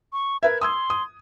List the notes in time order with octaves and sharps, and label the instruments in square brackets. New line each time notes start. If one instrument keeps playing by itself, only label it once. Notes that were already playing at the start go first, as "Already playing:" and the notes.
[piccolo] C#6
[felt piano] A#4 B4 E5 [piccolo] G#6
[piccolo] C6 [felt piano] D#6 E6 G#6
[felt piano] D#6